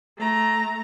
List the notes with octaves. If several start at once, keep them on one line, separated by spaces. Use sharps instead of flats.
A3 A#5